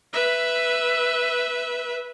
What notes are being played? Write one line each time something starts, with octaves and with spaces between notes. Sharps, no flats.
B4 E5